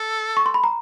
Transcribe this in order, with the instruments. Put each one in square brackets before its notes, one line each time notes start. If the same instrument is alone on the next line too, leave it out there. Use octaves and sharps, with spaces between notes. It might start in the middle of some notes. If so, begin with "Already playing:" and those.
Already playing: [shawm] A4
[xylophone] C#6
C6
B5
A#5